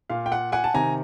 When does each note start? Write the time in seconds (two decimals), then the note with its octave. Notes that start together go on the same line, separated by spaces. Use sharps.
0.10 A#2 F5
0.26 G5
0.32 F#5
0.52 F#5 G#5
0.64 A5
0.74 C3 D#3 G#5 A#5